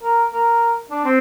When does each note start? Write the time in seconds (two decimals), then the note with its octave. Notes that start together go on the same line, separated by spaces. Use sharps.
0.03 A#4
0.32 A#4
0.90 D4
1.04 C4